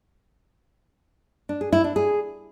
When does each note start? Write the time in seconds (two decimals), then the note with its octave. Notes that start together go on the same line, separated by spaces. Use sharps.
1.49 D4
1.61 G#4
1.73 E4
1.84 D4
1.96 G#4